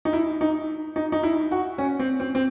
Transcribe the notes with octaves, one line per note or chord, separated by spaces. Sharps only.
D#4
E4
D#4
D#4
D#4
E4
F#4
C#4
C4
C4
C4